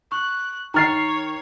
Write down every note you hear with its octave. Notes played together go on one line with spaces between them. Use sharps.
C#6 F#6
D#3 C#5 A#5 F6 A6 C7